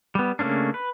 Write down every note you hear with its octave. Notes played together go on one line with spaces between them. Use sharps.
G3 B3
C#3 A3 A#3 C#4 D4
B4